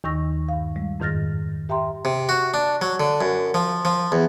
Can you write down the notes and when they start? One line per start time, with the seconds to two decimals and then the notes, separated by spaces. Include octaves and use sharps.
0.04 D#2 D#3 C#6 E6 A#6
0.49 G2 F5
0.76 G3 G#3
1.00 F2 G#2 D#3 F6 A6 A#6
1.69 G4 E5 G5 A#5 C6
2.05 C3
2.29 F#4
2.54 D4
2.82 F#3
3.00 D3
3.21 F#2
3.54 F3
3.85 F3
4.12 E2